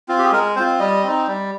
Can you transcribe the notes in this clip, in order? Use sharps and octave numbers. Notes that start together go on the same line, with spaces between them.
C4 F4
G4
G#4
G#3 A#4
C4 F4 C5
G3 D#5
C4 D#4
G3